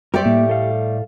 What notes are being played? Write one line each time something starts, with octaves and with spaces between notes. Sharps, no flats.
G3 A3 G4 A#4 C5 D5
A2 A#3
A4 F5